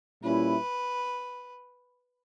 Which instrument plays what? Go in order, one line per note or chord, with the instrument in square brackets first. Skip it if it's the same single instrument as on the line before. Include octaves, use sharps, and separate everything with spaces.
[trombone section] A#2 G3 C#4 E4 [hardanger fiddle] B4